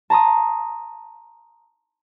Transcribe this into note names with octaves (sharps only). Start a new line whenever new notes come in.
A5 A#5 C6 D#6